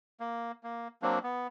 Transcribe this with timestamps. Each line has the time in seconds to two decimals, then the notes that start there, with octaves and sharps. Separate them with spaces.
0.20 A#3
0.63 A#3
1.02 F#3 A#3 C4 D4
1.23 B3